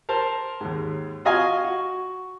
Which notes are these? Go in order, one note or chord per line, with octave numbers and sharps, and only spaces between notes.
A#4 C5 A5
D#2 G#2
F4 F#4 D#5 F5 G#5
F#4